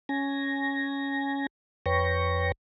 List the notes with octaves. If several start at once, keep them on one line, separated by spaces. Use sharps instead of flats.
C#4 G#5 A#6
F2 B4 C#5 G5 C#6 A#6